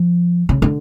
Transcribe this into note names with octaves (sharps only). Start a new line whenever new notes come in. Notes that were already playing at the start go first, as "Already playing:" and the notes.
Already playing: F3
C#3
D3